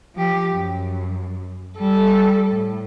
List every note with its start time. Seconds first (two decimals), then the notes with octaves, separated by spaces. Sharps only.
0.15 F3 G4
0.52 F#2
1.78 G3 A4
2.48 A2